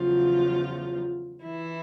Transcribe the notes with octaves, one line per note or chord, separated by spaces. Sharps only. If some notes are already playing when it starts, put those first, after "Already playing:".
Already playing: E2 C#3 F3 F#3 F4
E3 E4